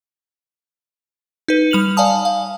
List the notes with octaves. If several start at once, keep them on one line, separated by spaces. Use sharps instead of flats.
D#4 B4
G3 F6 F7 F#7
D5 F5 G#5 A5 D#6
F5